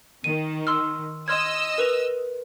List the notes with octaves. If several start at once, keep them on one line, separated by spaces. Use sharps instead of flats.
D#3 D#7
C6 E6 F6
D#5 C6 E6 F6 G#6
A#4 B4 F7